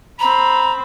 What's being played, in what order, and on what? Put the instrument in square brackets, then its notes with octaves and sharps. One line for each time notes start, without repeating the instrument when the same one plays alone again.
[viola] C4 B5 [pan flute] A#5